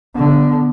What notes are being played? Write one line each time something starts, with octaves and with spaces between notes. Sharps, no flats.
D3 B3